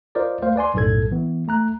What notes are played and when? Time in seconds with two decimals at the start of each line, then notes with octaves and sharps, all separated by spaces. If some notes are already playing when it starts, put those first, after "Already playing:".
0.15 F4 A#4 C5 D5 D#5
0.43 A3 C5 F5
0.56 B4 D5 G#5 C6
0.74 B1 F#2 A2 A4 G#6
1.11 E3 B3
1.48 A3 A#5 F#6